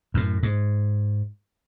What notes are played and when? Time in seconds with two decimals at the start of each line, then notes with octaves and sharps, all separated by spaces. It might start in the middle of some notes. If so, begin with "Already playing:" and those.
0.14 F#2 A2
0.43 G#2